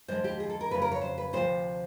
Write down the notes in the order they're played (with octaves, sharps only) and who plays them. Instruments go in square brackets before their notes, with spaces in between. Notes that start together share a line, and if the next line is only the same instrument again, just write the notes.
[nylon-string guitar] D#2 D3 F3 G#3 C5
G4
G#4
A4
A#4
F2 C#3 F#3 A3 B4
A#4
C#5
C5
B4
D2 C3 F3 C5